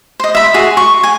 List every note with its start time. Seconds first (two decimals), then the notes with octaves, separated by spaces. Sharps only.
0.20 C5 D#5
0.35 E5 B5
0.54 F#4 G#4
0.77 C#6
1.03 G#5